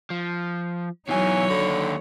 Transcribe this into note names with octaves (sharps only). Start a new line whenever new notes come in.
F3
B2 E3 F#3 D#4 C#5 G#5
D#2 D3 B5